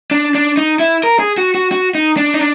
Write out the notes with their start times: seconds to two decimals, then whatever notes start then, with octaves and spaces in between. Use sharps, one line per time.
0.11 D4
0.35 D4
0.57 D#4
0.80 E4
1.03 A#4
1.19 G#4
1.38 F#4
1.55 F#4
1.72 F#4
1.95 D#4
2.17 D4
2.34 D#4
2.39 D4